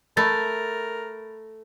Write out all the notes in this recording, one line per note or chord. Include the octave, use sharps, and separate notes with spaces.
A3 A#4 B5 A6